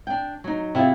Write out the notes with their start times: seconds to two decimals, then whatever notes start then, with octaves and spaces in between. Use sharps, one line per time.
0.07 D4 G5
0.44 F#3 D#4
0.75 C3 E4 F4 G#4